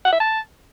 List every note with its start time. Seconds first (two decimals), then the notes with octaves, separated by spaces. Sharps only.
0.05 F#5
0.12 E5
0.20 A5